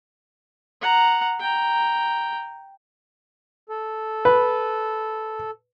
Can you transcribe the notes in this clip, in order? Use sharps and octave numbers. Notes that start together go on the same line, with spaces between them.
F#5 A#5
G5 A#5
A4
B4